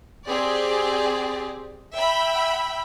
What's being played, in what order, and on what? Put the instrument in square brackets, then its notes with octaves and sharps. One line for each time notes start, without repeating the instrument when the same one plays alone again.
[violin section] C4 G4 G#4 D5
E5 G5 B5 E6